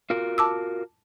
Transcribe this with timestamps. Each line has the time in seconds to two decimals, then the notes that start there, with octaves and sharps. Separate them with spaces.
0.10 F4 F#4 A#4
0.38 A5 D6 E6